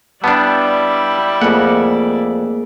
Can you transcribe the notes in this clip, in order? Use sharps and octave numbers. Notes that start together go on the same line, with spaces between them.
G3 B3 D4 E4 D5 A5
F2 A3 A#3 G#4 F#5